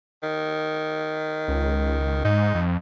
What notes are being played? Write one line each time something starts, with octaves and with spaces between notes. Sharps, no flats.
D#3
C#2
G#2 D#4
F2